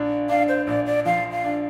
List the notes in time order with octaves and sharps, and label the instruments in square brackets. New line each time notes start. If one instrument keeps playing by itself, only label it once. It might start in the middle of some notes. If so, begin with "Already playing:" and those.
Already playing: [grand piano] A#1 D4
[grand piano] D4 [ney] F5
[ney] C5
[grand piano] A#1 [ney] D5
[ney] D5
[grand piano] F3 [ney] F5
[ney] F5
[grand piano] D4